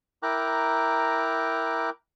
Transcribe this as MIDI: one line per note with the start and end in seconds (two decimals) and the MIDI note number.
0.23 1.90 64
0.23 1.90 70
0.23 1.90 79
0.23 1.90 82
0.23 1.90 86
0.23 1.90 90